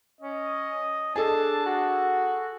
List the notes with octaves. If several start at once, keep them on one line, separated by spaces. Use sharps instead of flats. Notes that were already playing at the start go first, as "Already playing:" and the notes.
C#4 D#5
D4 G#4 A4 A5
F#4